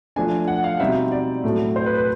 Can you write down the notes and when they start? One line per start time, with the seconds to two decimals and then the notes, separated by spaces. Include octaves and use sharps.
0.16 F3 A3 D4 G#5
0.48 F#5
0.64 F5
0.80 B2 G3 C4 D#4 E5
1.12 D5
1.44 A2 F#3 A3
1.76 C5
1.86 B4
1.97 B4